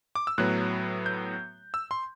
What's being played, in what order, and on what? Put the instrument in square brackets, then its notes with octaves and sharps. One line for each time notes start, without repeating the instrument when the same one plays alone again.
[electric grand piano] D6
E6
A2 F#3 B3 F#6
G6
E6
C6